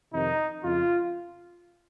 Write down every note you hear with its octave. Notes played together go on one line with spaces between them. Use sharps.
F2 C3 D#3 D#4
F2 C#3 F4